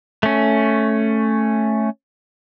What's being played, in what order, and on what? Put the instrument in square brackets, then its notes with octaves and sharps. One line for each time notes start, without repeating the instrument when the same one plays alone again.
[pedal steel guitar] A3 C#4